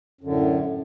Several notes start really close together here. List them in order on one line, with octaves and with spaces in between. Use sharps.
F#2 D3 A2